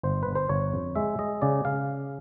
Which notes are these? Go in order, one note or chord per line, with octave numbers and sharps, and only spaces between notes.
G1 C5
G1 B4
C5
G1 C#5
F2
G#3 E5
G#3 D#5
C#3 D5
C#3 F5